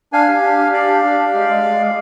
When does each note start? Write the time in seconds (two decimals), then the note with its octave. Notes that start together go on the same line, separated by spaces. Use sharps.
0.13 D4 F5 G#5
0.28 G4
0.43 D4
0.58 G4
0.73 G4 D5 F5
0.88 D4
1.04 D4
1.19 G4
1.34 G#3
1.50 G#3
1.64 G#3
1.80 G#3